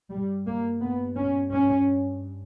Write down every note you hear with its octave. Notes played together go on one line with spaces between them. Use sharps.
G2 G3
A#3
B3
C#4
C#4